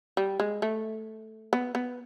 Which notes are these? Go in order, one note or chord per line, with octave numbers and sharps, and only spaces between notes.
G3
G#3
A3
B3
B3